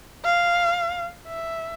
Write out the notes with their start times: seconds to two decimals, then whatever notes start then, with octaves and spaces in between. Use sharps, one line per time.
0.25 F5
1.27 E5